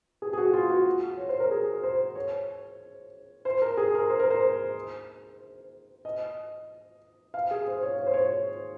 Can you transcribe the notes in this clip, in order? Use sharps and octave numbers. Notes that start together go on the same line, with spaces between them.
G#4
G#4
F#4
F4
F#4
C#5
C5
A#4
G#4
C5
C#5
C5
A#4
G#4
A#4
C5
A#4
C5
D#5
F5
G#4
C5
C#5
C#5
C5
C#5